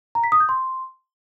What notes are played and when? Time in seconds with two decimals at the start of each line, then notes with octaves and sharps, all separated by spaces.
0.15 A#5
0.24 B6
0.32 D#6
0.40 G6
0.49 C6